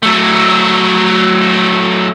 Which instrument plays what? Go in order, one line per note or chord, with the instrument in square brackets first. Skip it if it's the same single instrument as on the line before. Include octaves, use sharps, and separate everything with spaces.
[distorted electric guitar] F#3 A3